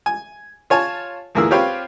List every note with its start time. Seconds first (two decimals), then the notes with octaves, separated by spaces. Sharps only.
0.06 G#5
0.70 F4 C#5 G#5 A5
1.35 D2 E3 A#3 G#4 E6
1.51 C4 F4 G4 B4 C#5 F5